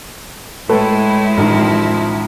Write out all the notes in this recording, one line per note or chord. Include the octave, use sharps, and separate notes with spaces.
A2 G#3 A3 E4 B4
A1 D#3 F3